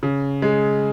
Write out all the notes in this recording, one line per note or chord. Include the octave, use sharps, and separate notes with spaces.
C#3
G#3